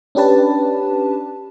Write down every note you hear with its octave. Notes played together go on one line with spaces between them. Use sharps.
C#4 D4 G4 B4 A5